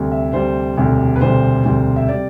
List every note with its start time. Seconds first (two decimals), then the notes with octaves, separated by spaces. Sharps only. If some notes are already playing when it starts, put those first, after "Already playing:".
Already playing: D2 C3 G3
0.12 E5
0.33 D2 C3 G3 C5
0.77 E1 D2 C3 G3
1.16 B4
1.21 E1 D2 C3 G3 C5
1.65 E1 D2 C3 G3
1.96 E5
2.09 C3 G3 D5